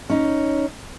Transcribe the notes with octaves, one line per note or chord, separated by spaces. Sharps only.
C#4 D#4